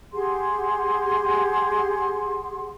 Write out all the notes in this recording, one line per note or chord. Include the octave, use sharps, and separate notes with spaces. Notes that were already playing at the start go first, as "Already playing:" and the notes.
G4 G#4 F#5 C6